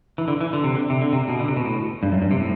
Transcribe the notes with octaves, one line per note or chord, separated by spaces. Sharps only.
E3
D3
E3
D3
C3
D3
C3
D3
C3
B2
D3
C3
B2
A2
G2
F#2
G2
C3
A2